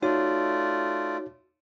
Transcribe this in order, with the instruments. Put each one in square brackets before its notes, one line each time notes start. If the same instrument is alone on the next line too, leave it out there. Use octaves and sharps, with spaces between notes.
[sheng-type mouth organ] A3 F4 D5 [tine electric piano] D#4 F#4 C#5